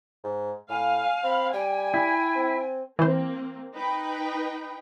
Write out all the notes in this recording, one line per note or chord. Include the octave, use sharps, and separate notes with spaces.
G#2
A2 F5 G#5
C4 B5
G3 G5 G#5
E4
C4
E3 A#3 C4 C5
D#4 B4 G5